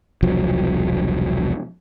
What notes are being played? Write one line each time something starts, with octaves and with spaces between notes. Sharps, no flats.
E1 C2 F3 F#3